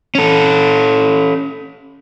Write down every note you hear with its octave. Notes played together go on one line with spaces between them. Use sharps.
C#4 A4